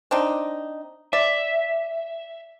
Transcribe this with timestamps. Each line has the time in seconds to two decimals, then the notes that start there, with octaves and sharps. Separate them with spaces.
0.11 C4 D4 D#4
1.13 D5 E5